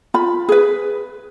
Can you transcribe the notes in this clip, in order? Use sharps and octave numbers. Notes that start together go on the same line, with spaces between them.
F4 B5
G#4 B4